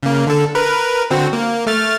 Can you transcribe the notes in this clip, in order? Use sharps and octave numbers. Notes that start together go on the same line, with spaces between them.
C#3 A#3
D3 A4
A#4 B4
D3 C4 F#4
A#3
A3 F6 A6